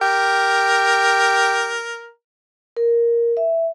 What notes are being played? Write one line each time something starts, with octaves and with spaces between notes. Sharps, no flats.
G4 A#4
A#4
E5